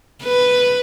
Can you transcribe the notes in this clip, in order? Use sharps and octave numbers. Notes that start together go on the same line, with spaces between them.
B4